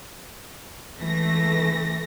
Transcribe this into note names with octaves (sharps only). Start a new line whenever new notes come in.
C#2 E3 A3 A#6